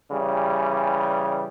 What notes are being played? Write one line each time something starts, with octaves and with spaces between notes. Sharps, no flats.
C#3 E3 G3